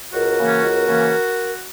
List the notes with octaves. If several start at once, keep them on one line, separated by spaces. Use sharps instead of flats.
C#2 F#4 A#4
C#3 E3 A#3 C#4
C#2
C#3 E3 A#3 C#4